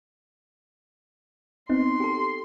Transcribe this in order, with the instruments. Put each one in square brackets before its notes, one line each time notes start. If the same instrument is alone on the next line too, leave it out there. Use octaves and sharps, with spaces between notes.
[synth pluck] B3 C4 D#4 [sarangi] C6
[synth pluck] G4 A4